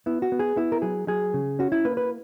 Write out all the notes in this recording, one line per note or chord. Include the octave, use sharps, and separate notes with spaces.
B3 E4
F#4
B3
G#4
B3 E4
A#4
F#3 G#4
F#3 G#4
C#3
C#4 F#4
E4
A#3 B4
B4